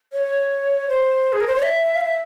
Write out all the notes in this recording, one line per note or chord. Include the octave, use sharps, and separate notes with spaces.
C#5
C5
G#4
A#4
C5
C#5
E5
F5
E5